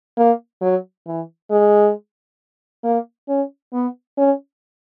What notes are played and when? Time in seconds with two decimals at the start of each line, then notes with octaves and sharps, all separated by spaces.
0.18 A#3
0.62 F#3
1.07 E3
1.51 G#3
2.84 A#3
3.28 C#4
3.73 B3
4.18 C#4